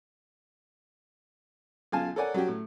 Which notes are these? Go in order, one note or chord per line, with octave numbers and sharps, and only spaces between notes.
B1 C#3 F4 F5 G#5 A5
A4 A#4 C#5 D5 F#5 G#5
F#3 C#4 F#4 G4
A2